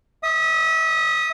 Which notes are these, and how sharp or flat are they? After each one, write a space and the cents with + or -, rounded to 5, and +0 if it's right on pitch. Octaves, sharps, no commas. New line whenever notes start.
E5 -30 D#6 +0